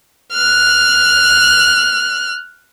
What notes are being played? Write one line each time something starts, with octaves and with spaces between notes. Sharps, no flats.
F6 F#6